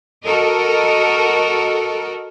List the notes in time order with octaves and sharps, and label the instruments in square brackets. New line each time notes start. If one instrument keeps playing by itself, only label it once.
[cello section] F#4 A4 A#4 D#5